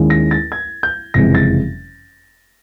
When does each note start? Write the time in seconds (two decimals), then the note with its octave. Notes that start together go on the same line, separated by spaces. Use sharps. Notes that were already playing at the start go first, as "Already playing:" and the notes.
Already playing: D#2 D#3 G#3 C#4 E4
0.10 A#6
0.31 A6
0.52 G#6
0.83 G6
1.14 F#1 F2 C3 E3 G#3 A#6
1.35 A6